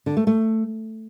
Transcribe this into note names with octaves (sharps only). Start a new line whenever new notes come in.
D3
A3
A3